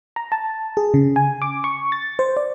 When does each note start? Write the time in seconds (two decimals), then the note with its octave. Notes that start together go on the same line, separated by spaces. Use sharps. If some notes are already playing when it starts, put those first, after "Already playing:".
0.16 A#5
0.32 A5
0.77 G#4
0.94 C#3
1.16 G#5
1.42 D6
1.64 C#6
1.92 A6
2.19 C5
2.37 D5